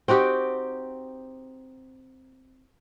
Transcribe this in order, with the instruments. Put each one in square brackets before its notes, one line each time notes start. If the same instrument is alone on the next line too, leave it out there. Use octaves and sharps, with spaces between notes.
[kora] C4 D#4 F#4 G4